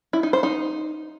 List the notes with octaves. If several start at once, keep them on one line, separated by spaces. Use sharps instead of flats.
E4
D#4
C5
D#4